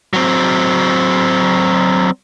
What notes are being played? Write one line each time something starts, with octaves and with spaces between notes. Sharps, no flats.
F#3 C4